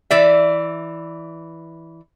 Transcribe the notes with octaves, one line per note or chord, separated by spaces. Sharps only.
E3 D5 E5